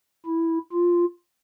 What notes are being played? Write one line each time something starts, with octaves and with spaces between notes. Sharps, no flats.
E4
F4